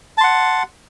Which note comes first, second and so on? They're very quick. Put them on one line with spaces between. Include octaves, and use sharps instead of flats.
A5 C6 F#5